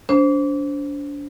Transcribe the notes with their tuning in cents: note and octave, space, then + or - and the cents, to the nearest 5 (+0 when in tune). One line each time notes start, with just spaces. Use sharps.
D4 -30 C5 +0